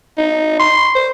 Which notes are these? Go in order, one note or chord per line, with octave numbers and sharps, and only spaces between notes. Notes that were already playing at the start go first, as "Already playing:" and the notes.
D#4
C6
C5